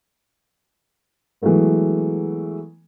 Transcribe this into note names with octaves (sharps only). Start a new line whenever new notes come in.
E3 F#3 G#3 A3 B3